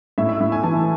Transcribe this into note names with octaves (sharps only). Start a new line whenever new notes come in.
A2 E5
E5
A2
G#5
E3 A5